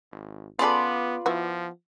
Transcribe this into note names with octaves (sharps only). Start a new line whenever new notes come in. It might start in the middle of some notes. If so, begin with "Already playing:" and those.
G#1
C#3 B3 F4 G#4 A4 B4 D5
F3 B3 E4 F#4